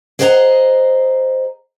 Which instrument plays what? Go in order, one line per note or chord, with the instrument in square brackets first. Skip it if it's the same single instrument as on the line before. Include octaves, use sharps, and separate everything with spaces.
[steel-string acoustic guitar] G#4 C5 D#5 F#5 A5 A#5